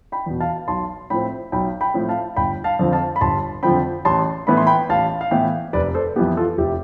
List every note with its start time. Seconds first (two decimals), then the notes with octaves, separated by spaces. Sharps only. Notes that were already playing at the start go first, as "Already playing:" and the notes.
0.12 G5 B5
0.26 E2 B2
0.40 F5 A5
0.68 B1 A5 C6
1.10 A2 F3 C4 G5 B5
1.52 B1 G5 B5
1.81 G5 B5
1.94 A2 F3 C4
2.09 F5 A5
2.36 G1 G5 B5
2.64 F5 A5
2.79 F2 D3 F3 C4
2.92 F5 A5
3.16 B5
3.21 G1 A5 C6
3.63 F2 D3 F3 C4 G5 B5
4.05 A1 A5 C6
4.47 A2 E3 B3 B5
4.57 C6
4.67 G5 B5
4.89 A1 F5 A5
5.21 F5
5.31 A2 E3 B3 E5 G5
5.73 F1 B4 D5
5.94 A4 C5
6.16 F2 E3 B3 G4 B4
6.37 F4 A4
6.58 F1 E4 G4